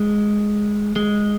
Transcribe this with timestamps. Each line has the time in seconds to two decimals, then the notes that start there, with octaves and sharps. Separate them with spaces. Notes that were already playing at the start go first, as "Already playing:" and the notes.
Already playing: G#3
0.96 G#3